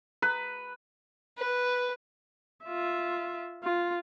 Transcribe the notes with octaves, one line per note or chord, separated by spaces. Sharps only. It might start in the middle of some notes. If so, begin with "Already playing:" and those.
B4
B4
F4 E5
F4